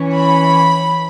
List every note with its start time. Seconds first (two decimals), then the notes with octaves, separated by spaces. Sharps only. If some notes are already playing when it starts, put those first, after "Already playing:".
Already playing: E3 C#4
0.15 B5